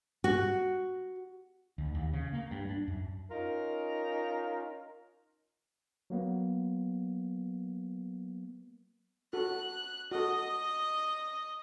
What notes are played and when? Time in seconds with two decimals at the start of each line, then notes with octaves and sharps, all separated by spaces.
0.24 F#4
1.78 D2
1.95 D#2
2.13 C#3
2.33 A#3
2.51 G2
2.69 D4
2.88 F#2
3.31 C#4 D#4 F4 A#4
6.10 F#3 A#3 B3
9.33 F#4 A4 F#6
10.12 F#4 A4 D#5